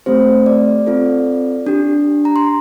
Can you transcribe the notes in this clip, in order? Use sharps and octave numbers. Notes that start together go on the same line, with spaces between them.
A3 C4 G4 C5
D5
C4 F4 A4
D4 G4
A#5
C6